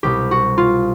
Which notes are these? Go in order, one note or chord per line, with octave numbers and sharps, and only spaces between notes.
C2 B2 G4
F#4
F4